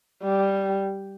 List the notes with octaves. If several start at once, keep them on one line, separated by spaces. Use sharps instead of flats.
G3